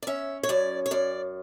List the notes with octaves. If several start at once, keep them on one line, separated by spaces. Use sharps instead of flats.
D5
C#4 E5
C#5
F#2 D5
C#5
F#2 D5